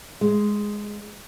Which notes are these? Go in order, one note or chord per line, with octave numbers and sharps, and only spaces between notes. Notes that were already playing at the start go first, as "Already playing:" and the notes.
G#3